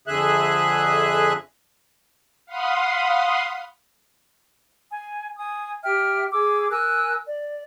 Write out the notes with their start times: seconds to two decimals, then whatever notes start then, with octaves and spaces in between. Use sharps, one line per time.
0.08 F2 D3 G#4 E5 F#6
2.46 F5 F#5 B5 C6 D#6
4.91 G#5
5.39 G#5 D#6
5.83 G4 E5 G5 F6
6.32 G#4 D6 E6
6.71 A#4 G#5 E6 F#6
7.26 D5